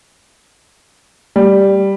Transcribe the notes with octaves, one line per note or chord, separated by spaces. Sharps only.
G3